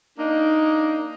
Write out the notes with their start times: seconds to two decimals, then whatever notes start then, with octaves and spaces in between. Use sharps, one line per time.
0.19 A#3 D4 D#4